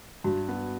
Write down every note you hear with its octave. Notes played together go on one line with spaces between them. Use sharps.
G2 F#4
B3